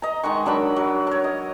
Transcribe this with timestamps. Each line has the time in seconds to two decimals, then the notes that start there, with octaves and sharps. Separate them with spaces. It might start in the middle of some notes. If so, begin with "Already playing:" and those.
0.02 D#5 A#5
0.23 D#3 G#3 F#5 C#6
0.46 F#3 D4 A#4 B5
0.76 F#3
1.07 A#4 C#5
1.24 D#5